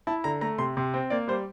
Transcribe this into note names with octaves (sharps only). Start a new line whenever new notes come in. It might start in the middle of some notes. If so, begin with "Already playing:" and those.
E4 A5
D3 A#5
A3 A#5
C3 C6
C3 C6
C4
A#3 D5
G3 C5